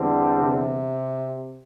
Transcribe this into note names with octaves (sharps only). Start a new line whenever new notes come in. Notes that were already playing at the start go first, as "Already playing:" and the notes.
Already playing: E2 D3 G3 C4
C3